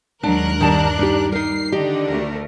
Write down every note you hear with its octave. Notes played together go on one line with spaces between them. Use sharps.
D#2 F#3 G#3 D4 A#4 F#6
G2 D#3 G3 D4 A5
D#4 G4
G3 D#4 A#4 C7
D3 D#3 D4 D#4 G4
D2 A3 A#4